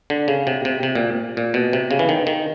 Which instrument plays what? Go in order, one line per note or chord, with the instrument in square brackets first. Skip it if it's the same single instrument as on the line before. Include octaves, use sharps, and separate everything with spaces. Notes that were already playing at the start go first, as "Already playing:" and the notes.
[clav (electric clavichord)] D3
C#3
C3
C3
C3
A#2
A#2
B2
C3
C#3
E3
D#3
D#3